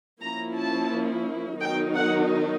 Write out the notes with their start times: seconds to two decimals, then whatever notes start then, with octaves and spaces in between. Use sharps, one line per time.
0.21 F3 A#3 C#4 E4 A#5
0.56 A5
1.59 D#3 F#3 B3 D#4 G5
1.95 F#5